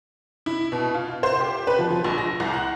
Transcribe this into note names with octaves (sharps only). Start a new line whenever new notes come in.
E4
B2
F4
C5
G4
B4
F3
F3
A#1
A#6
C2
F#5